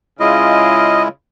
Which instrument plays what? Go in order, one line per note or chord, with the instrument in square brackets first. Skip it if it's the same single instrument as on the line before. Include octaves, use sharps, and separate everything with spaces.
[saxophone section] C#3 F4 [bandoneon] G#3 E4 [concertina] D#5